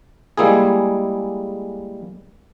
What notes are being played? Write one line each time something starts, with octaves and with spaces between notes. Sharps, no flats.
G3 G#3 A#3 E4 G#4